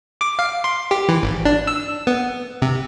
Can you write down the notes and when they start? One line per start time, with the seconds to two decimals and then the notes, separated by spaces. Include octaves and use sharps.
0.21 D6
0.39 F5
0.64 C6
0.91 G4
1.08 E3
1.23 G#1
1.45 D4
1.67 E6
2.07 B3
2.62 C3